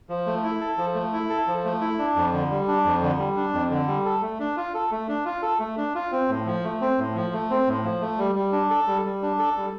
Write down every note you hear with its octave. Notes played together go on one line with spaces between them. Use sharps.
F3
A3
E4
A4
F3
A3
E4
A4
F3
A3
E4
D4
F2
D3
G3
D4
F2
D3
G3
D4
F2
D3
G3
A4
A3
D4
F4
A4
A3
D4
F4
A4
A3
D4
F4
C4
A2
F3
A3
C4
A2
F3
A3
C4
A2
F3
A3
G3
G3
D4
A4
G3
G3
D4
A4
G3